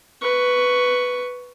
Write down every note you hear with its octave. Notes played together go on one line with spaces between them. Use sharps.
B4 C#6